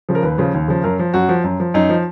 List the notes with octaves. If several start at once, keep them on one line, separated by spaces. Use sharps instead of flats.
C#3 F3
A#4
D#2 B4
C#3 F3
D#2
C#3 F3
F#2 A#4
F3
F#2 F#4
F3
F#2
F3
F#2 D#4
F3